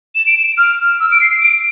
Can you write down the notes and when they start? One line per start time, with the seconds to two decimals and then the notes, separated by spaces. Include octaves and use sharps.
0.15 E7
0.27 D7
0.37 E7
0.58 F6
1.00 E6
1.11 D7
1.21 C7
1.42 D7